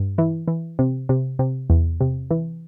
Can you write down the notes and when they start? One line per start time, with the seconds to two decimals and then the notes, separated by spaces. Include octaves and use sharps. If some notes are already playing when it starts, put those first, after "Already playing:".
Already playing: G2
0.18 E3
0.48 E3
0.79 C3
1.09 C3
1.39 C3
1.70 E2
2.01 C3
2.31 E3